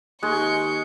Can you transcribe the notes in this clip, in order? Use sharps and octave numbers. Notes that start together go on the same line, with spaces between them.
D#2 G#3 C#6 G6